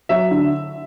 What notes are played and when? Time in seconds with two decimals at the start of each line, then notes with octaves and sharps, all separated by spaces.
0.09 F#3 E5
0.31 D3